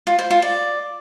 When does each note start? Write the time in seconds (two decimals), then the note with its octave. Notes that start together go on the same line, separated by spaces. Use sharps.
0.07 F4
0.19 C5
0.30 F4
0.42 D5